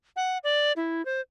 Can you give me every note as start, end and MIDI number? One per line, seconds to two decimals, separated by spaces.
0.16 0.38 78
0.44 0.72 74
0.76 1.04 64
1.05 1.21 72